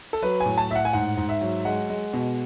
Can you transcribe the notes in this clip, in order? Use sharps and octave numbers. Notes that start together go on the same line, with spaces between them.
A4
F#3 B4
G#5
A2
A5
A2 E5
F#5
G#5
G#2 F#5
G#2
E5
F#3
G#3 F#5
G#3
B2